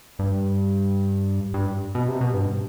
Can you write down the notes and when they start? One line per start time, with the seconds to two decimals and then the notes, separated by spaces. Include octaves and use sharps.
0.19 G2
1.54 G2
1.95 B2
2.08 C3
2.21 B2
2.34 G2